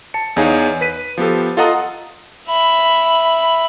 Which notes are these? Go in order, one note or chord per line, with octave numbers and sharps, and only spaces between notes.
A5 C#7
E2 D#4 G#4 C#5 F5
B4 B6 D#7
F3 B3 G4 A4
F4 A4 D#5 F#5 A#5 D#6
E5 B5